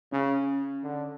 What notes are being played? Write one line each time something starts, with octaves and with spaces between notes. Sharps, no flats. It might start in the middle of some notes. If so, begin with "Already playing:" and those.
C#3 C#4
D3